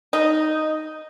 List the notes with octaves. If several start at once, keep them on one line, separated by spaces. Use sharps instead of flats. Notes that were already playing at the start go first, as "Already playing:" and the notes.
D#4